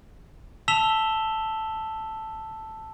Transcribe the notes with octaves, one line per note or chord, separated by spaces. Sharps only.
A5 E6 B6 E7 F7 G7